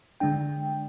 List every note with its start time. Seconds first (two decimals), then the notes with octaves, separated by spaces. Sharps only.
0.20 D3 G#3 D4 G5